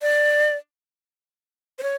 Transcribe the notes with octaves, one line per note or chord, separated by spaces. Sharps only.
D5
C5
C#5